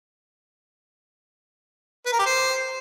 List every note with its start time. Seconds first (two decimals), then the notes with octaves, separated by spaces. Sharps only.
2.06 B4
2.12 A#4
2.19 G4
2.26 C5